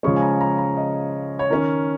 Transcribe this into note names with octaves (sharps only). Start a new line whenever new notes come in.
C#3 F3 G#3 C#4 C#6
G#5
A#5
A#5
A#5
D#5
C#5
D#3 C#4 A#4